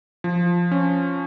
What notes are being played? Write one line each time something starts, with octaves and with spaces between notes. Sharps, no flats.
F3
C#4